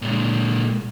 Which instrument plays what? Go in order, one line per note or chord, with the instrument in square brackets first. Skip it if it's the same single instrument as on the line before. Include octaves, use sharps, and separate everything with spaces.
[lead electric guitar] A#2 G#3